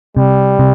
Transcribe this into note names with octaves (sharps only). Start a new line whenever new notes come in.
C3 G3
C3